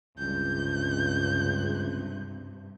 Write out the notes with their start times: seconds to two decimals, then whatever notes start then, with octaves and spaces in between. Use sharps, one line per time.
0.18 C#2 G2 C3 G6